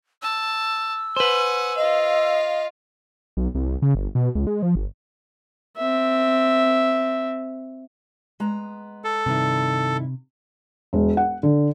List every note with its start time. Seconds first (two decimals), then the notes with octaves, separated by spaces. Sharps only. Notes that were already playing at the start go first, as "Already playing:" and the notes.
0.22 A5 E6
1.17 B4 C5 F#5 G#5
1.77 F4 D#5 F5
3.37 B1
3.55 C2
3.82 C#3
3.95 G1
4.15 B2
4.35 C#2
4.47 G#3
4.62 F3
4.75 G1
5.77 C4 E5
8.40 G#3 B3 A#5
9.04 A4
9.26 G2 C3 D#3 E4
10.93 E1
11.17 F#5
11.43 D3